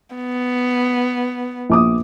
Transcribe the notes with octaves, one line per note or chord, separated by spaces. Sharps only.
B3
A#1 D6 D#6